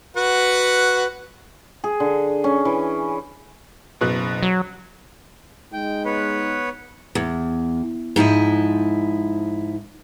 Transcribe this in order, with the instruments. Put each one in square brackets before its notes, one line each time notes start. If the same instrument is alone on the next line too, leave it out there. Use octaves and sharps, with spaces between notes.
[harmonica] F#4 B4 F#5
[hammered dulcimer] G#4
D3
C#4
E3
[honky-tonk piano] F#1 B2 F#6
[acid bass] F#3
[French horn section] G#3 D#4 [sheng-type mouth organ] G5
[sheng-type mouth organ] B3 B4 C#5
[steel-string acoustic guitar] E2
G#2 F3 E4 D#5